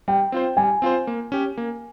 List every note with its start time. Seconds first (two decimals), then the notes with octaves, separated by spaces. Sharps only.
0.08 G3 G5
0.32 C4 F4 C5
0.57 G3 G#5
0.82 C4 F4 C5
1.07 A#3
1.32 C#4 G4
1.57 A#3